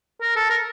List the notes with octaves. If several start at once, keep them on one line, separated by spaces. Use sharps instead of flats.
A#4
A4
A#4